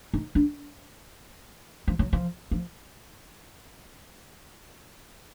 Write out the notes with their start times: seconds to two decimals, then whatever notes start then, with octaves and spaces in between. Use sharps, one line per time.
0.14 D#4
0.35 D4
1.88 F3
1.99 F#3
2.13 F3
2.51 F3